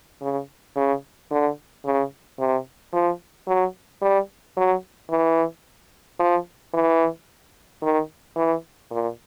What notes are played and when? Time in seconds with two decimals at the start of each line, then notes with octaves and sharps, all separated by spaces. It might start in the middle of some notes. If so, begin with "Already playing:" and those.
0.22 C#3
0.76 C#3
1.31 D3
1.85 C#3
2.40 C3
2.93 F3
3.48 F#3
4.02 G3
4.57 F#3
5.10 E3
6.20 F3
6.74 E3
7.82 D#3
8.37 E3
8.91 A#2